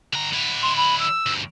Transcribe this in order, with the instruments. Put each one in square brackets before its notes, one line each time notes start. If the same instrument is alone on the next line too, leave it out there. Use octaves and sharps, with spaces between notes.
[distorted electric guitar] D3 A#5
D3 E4
[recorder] C6
B5
E6
[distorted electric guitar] D2 G2